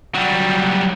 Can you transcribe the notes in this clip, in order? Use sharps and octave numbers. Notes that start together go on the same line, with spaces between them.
F#3 G3